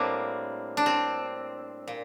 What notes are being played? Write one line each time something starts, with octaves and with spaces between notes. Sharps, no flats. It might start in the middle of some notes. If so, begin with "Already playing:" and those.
Already playing: A2 G3 A#3 C4 D4
D4
C4
A#2